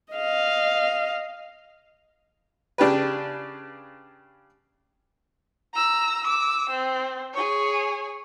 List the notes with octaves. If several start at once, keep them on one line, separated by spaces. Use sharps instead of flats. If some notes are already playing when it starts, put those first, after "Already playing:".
D#5 F5
C#3 D4 G4 B4
A#5 E6
D6 E6
C4
G#4 C#5